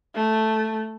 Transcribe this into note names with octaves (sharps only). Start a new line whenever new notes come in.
A3